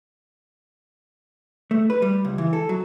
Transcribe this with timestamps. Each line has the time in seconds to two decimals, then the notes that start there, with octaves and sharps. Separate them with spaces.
1.71 A3
1.90 B4
2.02 G3
2.25 C#2
2.38 E3
2.53 A4
2.69 F#3